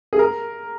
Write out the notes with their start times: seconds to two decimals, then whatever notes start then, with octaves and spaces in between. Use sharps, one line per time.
0.13 G#4
0.19 A#4